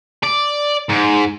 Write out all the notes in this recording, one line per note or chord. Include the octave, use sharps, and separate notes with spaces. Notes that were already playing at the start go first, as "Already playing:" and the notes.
D5
G#2